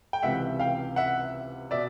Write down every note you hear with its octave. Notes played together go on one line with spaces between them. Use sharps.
G5
C#2 C3 E3 E5 F#5
F5 G5
E5 F#5
B2 D5 E5